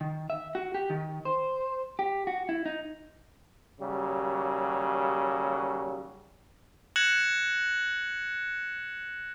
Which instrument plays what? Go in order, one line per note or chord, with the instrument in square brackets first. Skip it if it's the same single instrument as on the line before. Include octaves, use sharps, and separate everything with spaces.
[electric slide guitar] D#3
E5
F#4
G4
D#3
C5
G4
F#4
E4
D#4
[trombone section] D#2 C#3 F#3 G3
[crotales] F#6 G#6 A#6 C#7 E7 F#7